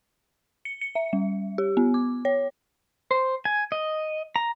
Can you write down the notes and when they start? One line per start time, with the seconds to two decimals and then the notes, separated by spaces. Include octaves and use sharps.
0.65 C#7
0.81 C#7
0.95 E5
1.13 G3
1.58 G4
1.77 B3
1.94 D6
2.25 C#5
3.11 C5
3.45 G#5
3.72 D#5
4.36 A#5